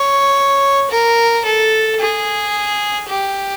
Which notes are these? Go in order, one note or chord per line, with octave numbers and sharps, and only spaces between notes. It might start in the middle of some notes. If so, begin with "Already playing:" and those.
Already playing: C#5
A#4
A4
G#4
G4